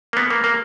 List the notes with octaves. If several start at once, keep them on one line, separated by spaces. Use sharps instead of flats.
A#3
B3
A#3
A#3